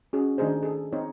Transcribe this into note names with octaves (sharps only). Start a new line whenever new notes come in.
C#4 F#4 G#4
D#3 A3 D4 D#4 G#4 C5
G#4 A4
C4 D#4 C#5